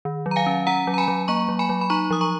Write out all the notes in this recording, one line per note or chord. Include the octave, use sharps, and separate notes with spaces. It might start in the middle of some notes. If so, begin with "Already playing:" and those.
D#3
F#3
A#5
F5 G#5
C#4
C#4 F#5 A#5
F#3
A#5
G#5 B5
F#3
A#3 A#5 C#6
F#3
G#5 B5
F#3
B5
D#4 A#5 C#6
F3 D#6
A#5 C#6